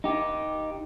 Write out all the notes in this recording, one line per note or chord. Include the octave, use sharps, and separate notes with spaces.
D#4 G4